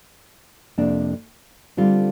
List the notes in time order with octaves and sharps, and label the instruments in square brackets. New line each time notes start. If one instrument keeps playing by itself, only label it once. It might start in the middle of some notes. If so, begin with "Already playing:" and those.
[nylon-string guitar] F2 C3 A#3 D4
D3 G3 C4 F4